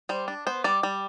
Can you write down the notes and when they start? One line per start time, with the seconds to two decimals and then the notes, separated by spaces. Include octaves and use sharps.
0.09 G3 C5
0.28 D4
0.47 B3 C5
0.64 G3 D5
0.83 G3